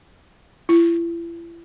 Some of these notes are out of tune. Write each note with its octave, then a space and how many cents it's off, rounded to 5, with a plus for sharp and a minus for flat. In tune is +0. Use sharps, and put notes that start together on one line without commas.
E4 +40